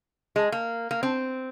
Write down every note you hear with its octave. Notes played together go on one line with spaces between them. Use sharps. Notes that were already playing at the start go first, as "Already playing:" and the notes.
G#3
A#3
A#3
C4